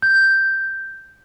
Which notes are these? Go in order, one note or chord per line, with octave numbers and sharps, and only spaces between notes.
G6